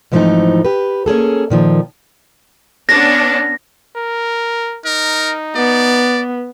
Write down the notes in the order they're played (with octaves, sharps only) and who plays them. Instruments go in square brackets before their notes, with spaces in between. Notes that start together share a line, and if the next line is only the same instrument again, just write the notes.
[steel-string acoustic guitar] G#2 E3 F3 A3 C4 D#4
G4 B4
A#3 C#4 G#4 A4
A#2 D#3 F3
[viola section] B3 C#4 D4 [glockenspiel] A#6
[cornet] A#4
[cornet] D#4 [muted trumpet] A#4
[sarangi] B3 [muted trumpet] D5